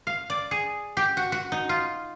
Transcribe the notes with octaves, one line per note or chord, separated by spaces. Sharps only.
F5
D5
G#4
G4
F#4
F#4
D#4
F4